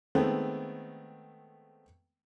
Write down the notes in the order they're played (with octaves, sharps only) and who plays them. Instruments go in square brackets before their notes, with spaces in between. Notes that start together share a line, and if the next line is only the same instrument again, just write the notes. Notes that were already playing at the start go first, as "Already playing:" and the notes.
[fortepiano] D#3 G#3 A3 B3 C4